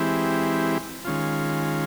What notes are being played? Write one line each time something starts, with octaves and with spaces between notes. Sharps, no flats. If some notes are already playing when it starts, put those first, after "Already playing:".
Already playing: E3 G#3 C4 E4 G4
D#3 G#3 C#4 F4